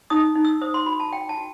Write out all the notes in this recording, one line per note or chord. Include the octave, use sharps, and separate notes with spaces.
D#4 D#6
D#4
E6
C5 D#6
C6
F#4 B5
A5
F#4 G5
A5
F#4